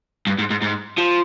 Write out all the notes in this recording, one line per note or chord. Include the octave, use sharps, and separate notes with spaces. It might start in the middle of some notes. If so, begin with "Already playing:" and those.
G2
G#2
G#2
G#2
F3